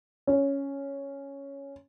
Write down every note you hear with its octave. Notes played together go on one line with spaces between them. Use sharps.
C#4